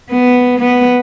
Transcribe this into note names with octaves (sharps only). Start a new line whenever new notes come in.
B3
B3